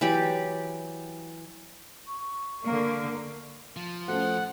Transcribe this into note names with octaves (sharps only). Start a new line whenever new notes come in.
E3 F#3 G4 D5
C#6
D3 A#3
F3
A3 C#4 C5 F#5